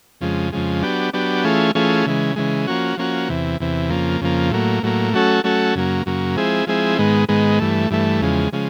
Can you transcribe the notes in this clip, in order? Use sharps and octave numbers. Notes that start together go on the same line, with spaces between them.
F2 C#3 F3 G#3
F2 C#3 F3 G#3
F#3 B3 D4 G4
F#3 B3 D4 G4
E3 A3 C#4 F4 G#4
E3 A3 C#4 F4 G#4
C#3 E3 G#3
C#3 E3 G#3
F3 A#3 C#4 F#4
F3 A#3 C#4 F#4
E2 C3 E3
E2 C3 E3
F2 C#3 F3 A#3
F2 C#3 F3 A#3
A2 F#3 A#3
A2 F#3 A#3
F#3 A3 C#4 F#4 A4
F#3 A3 C#4 F#4 A4
F#2 C#3 F#3 A#3
F#2 C#3 F#3 A#3
F3 G#3 C4 E4 G#4
F3 G#3 C4 E4 G#4
G#2 D#3 G#3 B3
G#2 D#3 G#3 B3
G2 E3 A3
G2 E3 A3
E2 C#3 F3 G#3
C#3 F3 G#3